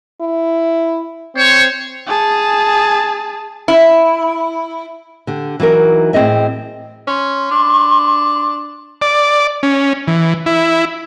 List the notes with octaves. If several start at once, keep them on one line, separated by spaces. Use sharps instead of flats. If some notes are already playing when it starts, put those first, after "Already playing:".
E4
C4 C5 C#5
G#4 A5
E4
D3 G4
E3 F#3 D#4 A#4
A2 C4 G#4 D#5 E5
C#4 C6
D4
D5
C#4
E3
E4